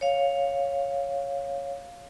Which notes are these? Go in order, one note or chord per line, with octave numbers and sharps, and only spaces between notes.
C#5 F5